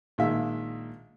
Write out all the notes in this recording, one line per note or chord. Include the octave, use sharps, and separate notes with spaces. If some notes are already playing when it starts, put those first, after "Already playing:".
A#1 D#3 G#3 E5